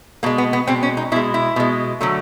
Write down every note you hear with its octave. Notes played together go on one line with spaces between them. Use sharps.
B2 G#3 A#3
B3
B3
B2 G#3 C4
C#4
D#4
B2 G#3 E4
E4
B2 G#3
D3 F#3 A3